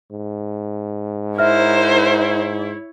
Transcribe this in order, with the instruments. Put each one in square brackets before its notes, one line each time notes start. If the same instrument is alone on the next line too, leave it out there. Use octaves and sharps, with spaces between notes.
[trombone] G#2
[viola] E4 C#5 [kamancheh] A#4 C5 [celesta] E5 F6